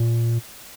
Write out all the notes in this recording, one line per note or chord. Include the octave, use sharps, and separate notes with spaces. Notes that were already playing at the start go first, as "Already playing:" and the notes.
Already playing: A#2